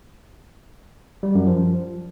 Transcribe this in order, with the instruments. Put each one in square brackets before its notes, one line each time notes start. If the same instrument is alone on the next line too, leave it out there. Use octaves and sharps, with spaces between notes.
[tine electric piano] G3
F#2
F3